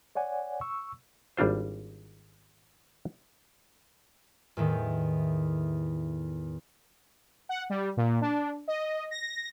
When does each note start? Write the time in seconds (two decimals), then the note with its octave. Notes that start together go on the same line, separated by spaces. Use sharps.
0.15 C#5 D5 F#5 G#5
0.61 C#6 E6
1.37 G#1 G3 D4 F4 C5
4.57 E2 A2 D#3
7.49 F#5
7.70 G3
7.97 A#2
8.21 D4
8.68 D#5
9.11 A#6